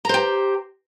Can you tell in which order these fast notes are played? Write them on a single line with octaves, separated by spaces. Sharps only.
A#5 C5 G4